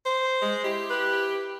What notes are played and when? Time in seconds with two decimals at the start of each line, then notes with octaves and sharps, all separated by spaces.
0.06 C5
0.42 G#3
0.65 E4 G4
0.90 B4